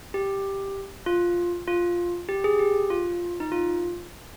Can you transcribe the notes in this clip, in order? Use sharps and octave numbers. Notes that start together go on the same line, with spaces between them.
G4
F4
F4
G4
G#4
G4
F4
D#4
F4